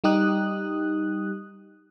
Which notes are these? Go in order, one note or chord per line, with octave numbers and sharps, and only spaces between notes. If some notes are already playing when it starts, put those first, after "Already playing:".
G3 D#4 G4 D#6 F#6